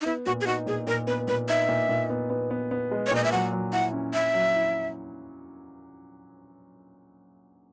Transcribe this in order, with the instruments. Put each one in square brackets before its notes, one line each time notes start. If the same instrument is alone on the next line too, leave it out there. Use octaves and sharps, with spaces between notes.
[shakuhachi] D#4
[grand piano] B3 [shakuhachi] E4
[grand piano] A#2 [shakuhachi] F#4
[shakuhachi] G#4
[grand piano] D#4 [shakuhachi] F#4
[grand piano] A#2 [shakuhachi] G#4
[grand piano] A#2 [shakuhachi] A#4
[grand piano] B3 [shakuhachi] B4
[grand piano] A#2 [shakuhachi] B4
[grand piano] D#4 [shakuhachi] E5
[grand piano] A#2
A#2
B3
B3
B3
B3
G#3
[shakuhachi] C#5
[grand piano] A#2 [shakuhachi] D#5
[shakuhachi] E5
[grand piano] F#3 [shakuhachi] F#5
[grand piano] F#3
[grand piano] E4 [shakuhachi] F#5
[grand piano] C#4
[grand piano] C#4 [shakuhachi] E5
[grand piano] F#3
E4